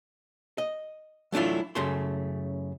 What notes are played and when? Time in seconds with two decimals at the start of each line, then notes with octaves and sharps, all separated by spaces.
0.58 D#5
1.32 F#3 A3 D4 E4 F4
1.75 F#2 C#3 A3 C6